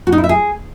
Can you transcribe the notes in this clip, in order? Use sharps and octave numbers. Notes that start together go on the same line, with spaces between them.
F#4
D#4
E4
E5
G#4